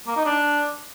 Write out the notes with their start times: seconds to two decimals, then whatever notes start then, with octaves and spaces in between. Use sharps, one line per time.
0.07 A#3
0.16 D#4
0.26 D4